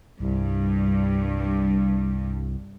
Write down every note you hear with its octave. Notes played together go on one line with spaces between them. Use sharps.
C2 G2